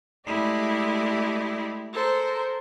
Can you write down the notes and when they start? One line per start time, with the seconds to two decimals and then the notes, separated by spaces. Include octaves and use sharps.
0.27 G#3 A3 E4 G4 D5 D#5
1.93 A4 A#4 C5